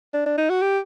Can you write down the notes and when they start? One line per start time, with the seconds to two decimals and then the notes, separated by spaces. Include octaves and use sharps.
0.14 D4
0.26 D4
0.38 D#4
0.50 F#4
0.62 G4